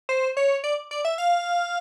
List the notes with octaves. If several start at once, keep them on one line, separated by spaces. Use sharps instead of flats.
C5
C#5
D5
D5
E5
F5